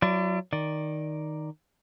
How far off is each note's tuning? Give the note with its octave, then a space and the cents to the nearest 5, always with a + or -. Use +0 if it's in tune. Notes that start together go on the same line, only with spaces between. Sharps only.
F#3 +0 E4 +45 D5 +0
D#3 +0 D5 +0